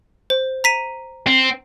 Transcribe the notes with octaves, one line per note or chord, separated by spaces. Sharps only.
C5
A#5 B6 D#7
C4